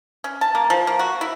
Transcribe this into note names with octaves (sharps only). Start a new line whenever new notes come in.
C#4
A5
A#3
F3
A#3
F#4
E4